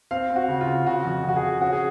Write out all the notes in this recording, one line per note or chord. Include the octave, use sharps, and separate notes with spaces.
C4 F5
C4
F#4
C#3
F4
C#3
C#3 F#4
F2
F2
F#4
G#4
C#3
C#4 F#4
G#4